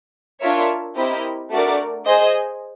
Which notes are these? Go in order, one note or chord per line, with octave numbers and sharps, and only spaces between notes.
D4 F4 A#4 C#5 E5
C4 E4 G4 A#4 D#5
A3 D4 F#4 A#4 D5
G#4 C5 D#5